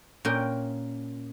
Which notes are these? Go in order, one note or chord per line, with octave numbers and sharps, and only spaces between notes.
A#2 C#4 A#4 G5